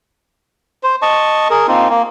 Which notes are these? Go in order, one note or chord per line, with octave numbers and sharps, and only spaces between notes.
C5
D#5 A5 C#6
G#4 A#4
A#3 C4 D#4 F4
A#3